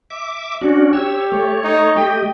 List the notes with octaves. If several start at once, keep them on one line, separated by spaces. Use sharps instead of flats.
E5 D6
C#4 D4 F#4
G4 C#5 E6
A3 C#5
D#4
A3 G4 D#5 G5